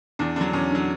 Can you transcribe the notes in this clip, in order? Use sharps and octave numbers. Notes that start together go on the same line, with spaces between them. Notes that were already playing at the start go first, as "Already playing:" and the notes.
E2 D4
D3 F#3 D4
E2 C#4
D3 F#3